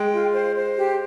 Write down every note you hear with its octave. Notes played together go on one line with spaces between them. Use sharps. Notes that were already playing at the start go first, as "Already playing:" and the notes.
Already playing: G#3 G5
F4
C5
C5
G4